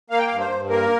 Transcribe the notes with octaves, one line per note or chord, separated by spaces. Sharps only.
A#3 F5
G5
G2 F5
C5
G2
A#3 A#4